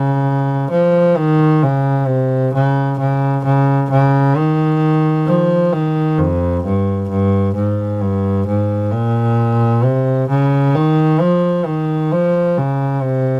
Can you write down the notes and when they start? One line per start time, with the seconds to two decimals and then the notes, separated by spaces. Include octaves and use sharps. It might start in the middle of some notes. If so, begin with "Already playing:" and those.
Already playing: C#3
0.71 F3
1.17 D#3
1.62 C#3
2.07 C3
2.54 C#3
2.99 C#3
3.45 C#3
3.91 C#3
4.36 D#3
5.27 F3
5.73 D#3
6.19 F2
6.64 G2
7.09 G2
7.55 G#2
8.01 G2
8.47 G#2
8.92 A#2
9.84 C3
10.29 C#3
10.75 D#3
11.20 F3
11.66 D#3
12.12 F3
12.57 C#3
13.03 C3